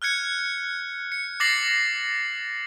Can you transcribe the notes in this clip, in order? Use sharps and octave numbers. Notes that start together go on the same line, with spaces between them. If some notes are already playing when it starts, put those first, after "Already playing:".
F6 F#6 G#6 C#7
C#7
D6 A6 A#6 C7 F#7